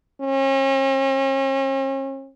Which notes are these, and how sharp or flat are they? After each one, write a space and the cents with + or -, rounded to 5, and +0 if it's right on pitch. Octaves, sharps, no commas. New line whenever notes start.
C#4 -45